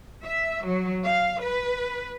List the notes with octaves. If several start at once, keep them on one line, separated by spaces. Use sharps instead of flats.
E5
F#3
F5
B4